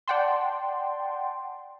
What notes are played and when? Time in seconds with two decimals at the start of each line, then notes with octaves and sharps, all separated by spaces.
0.08 D5 F#5 G5 A5 C6